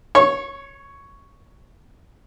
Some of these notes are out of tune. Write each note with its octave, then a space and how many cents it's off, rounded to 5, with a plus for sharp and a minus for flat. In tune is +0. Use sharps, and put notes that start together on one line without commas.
C#5 +0 C#6 -30